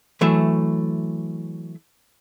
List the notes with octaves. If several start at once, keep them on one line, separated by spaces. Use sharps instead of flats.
E3 F#3 A3 E5